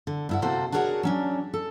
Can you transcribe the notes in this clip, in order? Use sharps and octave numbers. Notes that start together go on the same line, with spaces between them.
D3
G2 E4 F#5
C3 A#3 F#4 A4 C5
D4 F#4 G#4 A#4 C#5 F#5
F#3 C#4 D4
A4